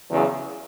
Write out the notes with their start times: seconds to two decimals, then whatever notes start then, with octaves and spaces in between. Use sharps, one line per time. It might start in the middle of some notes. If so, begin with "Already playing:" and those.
0.10 E2 C#3 F#3